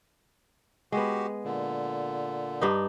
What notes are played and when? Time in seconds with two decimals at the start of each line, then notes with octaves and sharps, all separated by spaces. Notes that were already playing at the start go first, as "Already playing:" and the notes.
0.92 G#3 B3 F#4 G4
1.44 A#2 D3
2.61 G2 D4 D#4